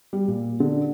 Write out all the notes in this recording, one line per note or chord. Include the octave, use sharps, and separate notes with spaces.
G3
A#2
D3